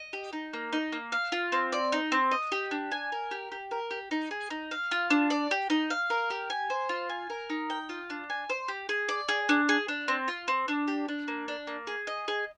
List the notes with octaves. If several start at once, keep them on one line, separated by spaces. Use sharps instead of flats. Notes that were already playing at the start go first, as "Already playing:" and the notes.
Already playing: D#5
G4
D#4
A#3
D#4
A#3
F5
F4
C4
D5
D#4
C4
D#5
G4
D4
G#5
A#4
G4
G4
A#4
G4
D#4
G#4
D#4
F5
F4
D4
D5
G4
D#4
F5
A#4
G4
G#5
C5
F4
G#5
A#4
D#4
G5
F4
D4
G#5
C5
G4
G#4
D5
G#4
D4
G#4
D4
C4
F4
C4
D4
G4
D4
A#3
D4
A#3
G#4
D#5
G#4